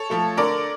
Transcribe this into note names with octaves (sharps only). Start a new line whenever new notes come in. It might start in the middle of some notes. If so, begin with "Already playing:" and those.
Already playing: A4 C#5
F3 A3
D3 A#4 D5